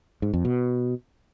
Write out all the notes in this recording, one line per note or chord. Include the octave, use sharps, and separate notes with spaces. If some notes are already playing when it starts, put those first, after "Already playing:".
G#2
F2
B2